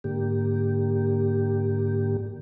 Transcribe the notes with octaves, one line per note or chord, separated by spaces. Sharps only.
G#2 D3 A#3 G4